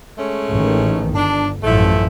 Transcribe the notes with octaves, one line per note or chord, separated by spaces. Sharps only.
G#3 A3 C#4
A1 D#3
G1 D4
A1 F#2 F3 A3 E4